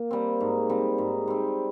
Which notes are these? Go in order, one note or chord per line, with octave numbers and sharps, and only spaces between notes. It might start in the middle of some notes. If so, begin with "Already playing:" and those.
Already playing: A#3
G3 C4
G#2
G3 C4
G#2
G3 C4